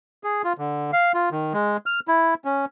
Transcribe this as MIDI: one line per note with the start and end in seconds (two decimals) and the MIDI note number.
0.24 0.42 68
0.44 0.53 65
0.58 0.91 50
0.93 1.12 77
1.14 1.29 65
1.32 1.53 51
1.53 1.77 56
1.86 2.00 89
2.08 2.34 64
2.45 2.65 61